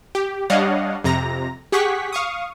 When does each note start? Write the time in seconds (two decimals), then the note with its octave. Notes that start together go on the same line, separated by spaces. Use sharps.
0.15 G4
0.50 G3 D4 C#5 D#5 F5 F#5
1.04 F2 C3 A#5 A#6
1.72 G4 G#4 F#5 C#6 B6
2.12 F5 C#6 D#6